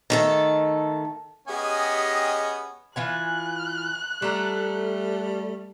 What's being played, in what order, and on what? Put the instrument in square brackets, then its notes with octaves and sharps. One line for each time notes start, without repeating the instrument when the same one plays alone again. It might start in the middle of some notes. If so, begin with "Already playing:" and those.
[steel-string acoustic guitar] D#3 A3 A4
[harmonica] B3 C#4 G#5 [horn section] G4 G#4 D#5
[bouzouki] E3 F4 G#5 [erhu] F#6
[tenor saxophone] G3 [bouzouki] A3 A#5 [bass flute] A4